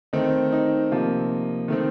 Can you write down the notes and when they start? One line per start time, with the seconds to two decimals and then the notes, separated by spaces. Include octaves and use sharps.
0.13 D#3 A3 C4 D#4
0.52 D#4
0.91 C3 F3 A#3
1.68 D#3 A3 C4